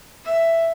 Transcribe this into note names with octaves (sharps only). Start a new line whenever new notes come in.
E5